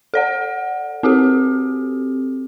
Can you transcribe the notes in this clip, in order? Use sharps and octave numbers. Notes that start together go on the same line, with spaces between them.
A4 D5 F#5
C4 F#4 G4 A4